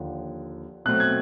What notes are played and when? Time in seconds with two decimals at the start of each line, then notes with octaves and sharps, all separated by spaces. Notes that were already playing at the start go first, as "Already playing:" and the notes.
Already playing: D#2 D3 F3
0.85 B2 F#3 A3 C4 F#6
1.00 G#6